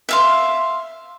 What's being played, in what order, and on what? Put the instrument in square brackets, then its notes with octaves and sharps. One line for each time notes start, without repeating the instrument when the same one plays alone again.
[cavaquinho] E5 F5 C6